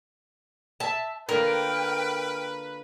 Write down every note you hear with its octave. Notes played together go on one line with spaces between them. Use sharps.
E5 A5
D3 A#3 F4 A#4 B4 G5 F6